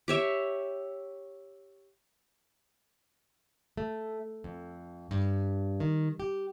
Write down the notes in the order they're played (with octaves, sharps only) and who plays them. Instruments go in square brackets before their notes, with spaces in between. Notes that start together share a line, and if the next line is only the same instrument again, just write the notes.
[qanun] G4 C#5 E5
[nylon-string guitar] A3
F2
G2
D#3
G4